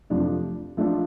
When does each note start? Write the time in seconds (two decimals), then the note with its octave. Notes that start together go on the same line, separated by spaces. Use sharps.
0.10 F2 C3 F3 A3 D4
0.77 F3 A3 D4 F4